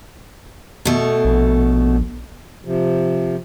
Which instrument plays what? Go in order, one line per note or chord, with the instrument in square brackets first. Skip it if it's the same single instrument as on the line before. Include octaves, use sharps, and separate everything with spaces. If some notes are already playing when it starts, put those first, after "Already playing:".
[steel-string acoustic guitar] B2 A3
[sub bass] A#1
[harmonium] C3 F3